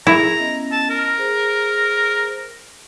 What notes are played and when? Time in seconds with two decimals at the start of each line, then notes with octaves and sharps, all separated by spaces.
0.07 E4 G#4 A4 A#5
0.39 B3 C#4 D#5
0.72 A5
0.90 A#4
1.18 G#4 C5 A#5